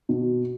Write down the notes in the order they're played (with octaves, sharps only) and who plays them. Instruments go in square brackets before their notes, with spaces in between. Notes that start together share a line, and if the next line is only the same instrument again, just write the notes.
[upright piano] B2